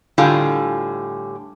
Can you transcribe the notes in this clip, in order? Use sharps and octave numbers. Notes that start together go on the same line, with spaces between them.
A2 D3 G3 F4 G#4